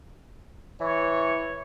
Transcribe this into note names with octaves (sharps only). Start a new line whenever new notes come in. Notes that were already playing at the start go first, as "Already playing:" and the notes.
E3 C#5